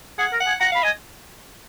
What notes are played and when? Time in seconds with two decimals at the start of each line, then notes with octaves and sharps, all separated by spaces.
0.18 G#4 F#5
0.32 A#4
0.40 F#5
0.47 G#5
0.61 F#5 A#5
0.72 F5
0.75 B5
0.83 D#5 G#5